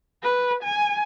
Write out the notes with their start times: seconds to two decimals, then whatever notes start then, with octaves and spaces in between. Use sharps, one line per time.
0.23 B4
0.63 G#5